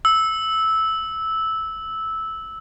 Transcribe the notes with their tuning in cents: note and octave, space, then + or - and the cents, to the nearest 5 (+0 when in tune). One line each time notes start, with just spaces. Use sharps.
E6 -10